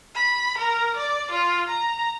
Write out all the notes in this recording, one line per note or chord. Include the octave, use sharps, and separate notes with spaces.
B5
A#4
D5
F4
A#5